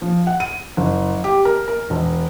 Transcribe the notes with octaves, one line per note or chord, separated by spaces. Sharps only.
F3
F#5
D#7
F#1
G4
A#4
A#4
E1